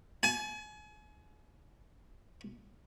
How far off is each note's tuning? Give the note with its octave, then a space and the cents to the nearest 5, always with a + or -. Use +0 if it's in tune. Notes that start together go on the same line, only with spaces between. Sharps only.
G#5 +35